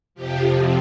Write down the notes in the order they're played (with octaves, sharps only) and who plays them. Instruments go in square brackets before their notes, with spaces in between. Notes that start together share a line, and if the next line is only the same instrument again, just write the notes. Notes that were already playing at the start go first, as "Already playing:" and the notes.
[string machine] F2 C3 F3 G4